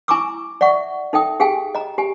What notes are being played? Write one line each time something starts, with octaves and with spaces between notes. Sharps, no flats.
E4 G#5 A#5 C#6 D6 E6
D5 E5 F#5 C#6
D#4 A4 E5 G5 D#6
G4 G#4 F5 G5 G#5
D#5 A#5
G4 G#5